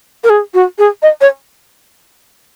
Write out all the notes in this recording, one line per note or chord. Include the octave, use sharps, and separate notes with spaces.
A#4
G#4
F#4
G#4
D#5
C#5